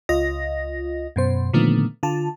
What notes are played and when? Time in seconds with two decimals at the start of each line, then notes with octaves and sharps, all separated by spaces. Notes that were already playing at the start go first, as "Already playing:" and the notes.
0.09 C#2 F4 D#5 A#6
1.16 F#2 B2 C5
1.53 A#2 D3 D#3 F3 A3 B3
2.03 D3 F4 A5